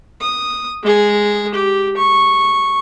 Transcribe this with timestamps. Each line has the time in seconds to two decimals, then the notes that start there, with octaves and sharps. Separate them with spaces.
0.21 D#6
0.83 G#3 G#4
1.54 G4
1.97 C#6